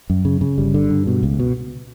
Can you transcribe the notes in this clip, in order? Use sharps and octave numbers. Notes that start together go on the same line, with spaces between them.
F#2
C#3
C#3
G1 G3
D3
G2
B2
C#2
B2